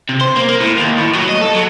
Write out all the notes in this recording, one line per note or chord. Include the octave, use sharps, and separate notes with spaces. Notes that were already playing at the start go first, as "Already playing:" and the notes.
C3
C5
A#3
A#3
A2
D#2
A2
F#3
D#5
A4
F#3